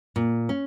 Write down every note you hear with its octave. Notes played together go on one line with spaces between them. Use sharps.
A#2
C#4